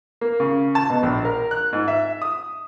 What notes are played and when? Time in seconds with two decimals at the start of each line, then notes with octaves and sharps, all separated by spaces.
0.21 A#3
0.40 C#3
0.75 A5
0.90 B2
1.03 A#1
1.25 A#4
1.51 F#6
1.73 G#2
1.88 E5
2.22 D#6